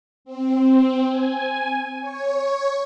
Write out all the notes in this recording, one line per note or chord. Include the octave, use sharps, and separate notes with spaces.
C4
G#5
C#5